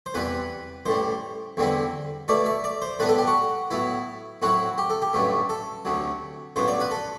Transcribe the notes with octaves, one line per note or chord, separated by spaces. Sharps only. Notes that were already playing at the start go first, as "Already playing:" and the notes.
C5
E2 C3 G3 B4
A1 A2 G3 C5
E2 D3 G3 C4 E4
B2 A3 E4 D5
E5
D5
C5
A2 G3 B3 D4 B4
A4
G4
F#4
A2 F#3 B3 E4
A2 F#3 C4 E4 F#4
G4
A4
G4
A1 G2 F#3 A3
A4
D2 C3 F#3
A1 G2 F#3 B3 C5
D5
B4
A4